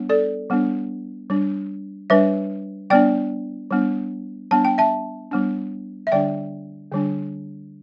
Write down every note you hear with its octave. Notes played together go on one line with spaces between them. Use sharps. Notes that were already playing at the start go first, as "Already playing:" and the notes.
Already playing: G3 B3 D4
A4 D5
G3 B3 D4
G3 D4
G3 D4 B4 E5
G3 B3 D4 D5 G5
G3 B3 D4
G3 B3 D4 A5
G5
E5 A5
G3 B3 D4
E5
D3 G3 D4 D5 G5
D3 G3 D4